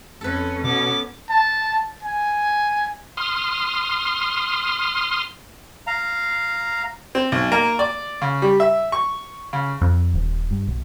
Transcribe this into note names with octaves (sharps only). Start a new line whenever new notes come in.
F2 C#4 A4 B4
B2 B3 C#4 D6
A5
G#5
C6 D#6 F6
F5 A#5
C4
B1
A#3
D5
C#3
G3
E5
C#6
C#3
F2
D#1
G2
B1